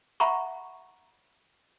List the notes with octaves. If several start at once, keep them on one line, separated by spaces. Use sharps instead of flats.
E5 F#5 A#5 B5 C#6